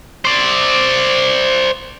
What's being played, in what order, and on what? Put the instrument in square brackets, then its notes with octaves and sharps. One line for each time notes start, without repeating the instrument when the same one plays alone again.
[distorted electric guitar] C5 D5